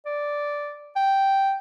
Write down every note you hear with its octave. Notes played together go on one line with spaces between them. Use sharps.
D5
G5